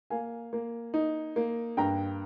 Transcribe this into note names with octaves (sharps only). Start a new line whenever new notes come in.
A#3 F5 G#5
A#3
D#4
A#3
G2 G5 A#5